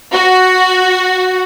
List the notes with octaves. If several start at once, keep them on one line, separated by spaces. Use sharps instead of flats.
F#4